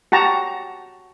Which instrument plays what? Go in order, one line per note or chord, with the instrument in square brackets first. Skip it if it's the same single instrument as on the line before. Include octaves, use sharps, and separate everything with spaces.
[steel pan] F#4 G4 A5 A#5